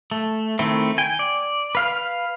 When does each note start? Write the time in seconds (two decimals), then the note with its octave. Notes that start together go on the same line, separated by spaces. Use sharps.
0.11 A3
0.59 D#3 A3 C4 E4
0.98 G5 G#5
1.19 D5
1.75 B4 F5 F6